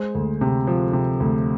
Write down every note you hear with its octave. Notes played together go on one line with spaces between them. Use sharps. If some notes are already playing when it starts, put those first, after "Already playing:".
Already playing: G#3 C5
D2
C3
F3
C3
D2